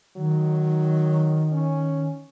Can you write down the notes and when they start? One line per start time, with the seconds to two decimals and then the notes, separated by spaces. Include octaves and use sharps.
0.17 D#3 F#3
1.52 C#4